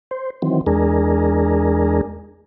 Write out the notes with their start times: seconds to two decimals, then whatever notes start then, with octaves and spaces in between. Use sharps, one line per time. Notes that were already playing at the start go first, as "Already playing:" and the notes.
0.11 C5
0.42 D#3 E3 F#3 C4
0.66 E2 G#3 D4 G#4 A#4